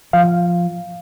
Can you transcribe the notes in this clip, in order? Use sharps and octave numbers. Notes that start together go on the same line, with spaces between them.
F3 F5